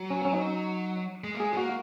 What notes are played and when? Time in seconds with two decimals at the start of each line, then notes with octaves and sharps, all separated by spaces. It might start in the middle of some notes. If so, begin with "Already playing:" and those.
Already playing: F#3
0.10 C#4
0.25 C#4
0.33 D#4
1.24 G#3
1.34 A#3
1.40 G#3 G#4
1.53 C4
1.57 A#3 F#4